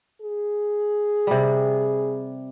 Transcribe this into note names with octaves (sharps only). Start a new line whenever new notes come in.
G#4
C3 G3